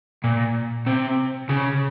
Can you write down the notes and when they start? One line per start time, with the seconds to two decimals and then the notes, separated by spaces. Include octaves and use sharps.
0.24 A#2
0.87 C3
1.49 C#3